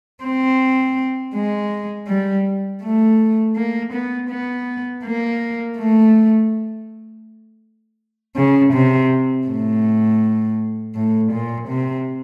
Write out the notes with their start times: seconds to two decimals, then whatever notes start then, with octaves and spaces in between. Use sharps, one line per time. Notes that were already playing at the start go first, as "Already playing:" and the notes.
0.24 C4
1.34 G#3
2.08 G3
2.82 A3
3.56 A#3
3.93 B3
4.29 B3
5.04 A#3
5.77 A3
8.36 C#3
8.73 C3
9.47 A2
10.95 A2
11.32 A#2
11.68 C3